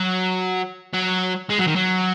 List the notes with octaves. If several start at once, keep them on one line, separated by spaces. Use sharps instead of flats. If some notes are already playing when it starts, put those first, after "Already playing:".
Already playing: F#3
F#3
G#3
F#3
D#3
F#3